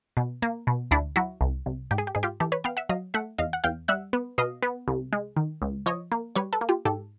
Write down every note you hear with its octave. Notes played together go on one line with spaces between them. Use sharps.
B2
A#3
B2
D2 D4 E4
F#3 E4 F#4
C2
C2
G#2 G4
G#4
G4
G#2 G#4
F4 G4
E3 G4 A4
B4 C#5
B3 F5 G5
E5 F#5
F#3 D#5 F5
A3 E5 F#5
E2 D#5 F5
F#5
E2 F5 G5
G3 E5 F#5
B3
B2 D#5 F5
B3
C2
G#3
D#3
C#2
F3 C#5 D#5
A#3
G3 B4 C#5
A4 B4
A#3
F4 G4
G#2 G4 A4